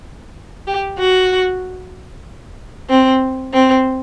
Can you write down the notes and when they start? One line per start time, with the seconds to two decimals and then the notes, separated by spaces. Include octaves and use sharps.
0.67 G4
0.98 F#4
2.89 C4
3.53 C4